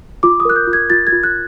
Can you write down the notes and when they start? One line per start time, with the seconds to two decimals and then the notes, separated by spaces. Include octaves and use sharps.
0.23 F4 D6
0.40 D#6
0.45 A#4 F#6
0.56 G6
0.67 F4
0.73 G#6
0.90 F4 A6
1.07 G#6
1.12 F4
1.23 F#6